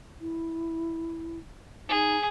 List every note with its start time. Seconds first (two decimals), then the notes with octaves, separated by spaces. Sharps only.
0.21 E4
1.89 D#4 G#4